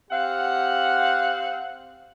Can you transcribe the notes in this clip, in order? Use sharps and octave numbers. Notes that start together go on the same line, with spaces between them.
C4 G4 F5 F#5